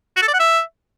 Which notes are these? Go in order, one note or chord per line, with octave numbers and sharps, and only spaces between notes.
F#4
A4
D5
F#5
E5